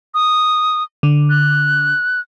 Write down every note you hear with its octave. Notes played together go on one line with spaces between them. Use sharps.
D#6
D3
F#6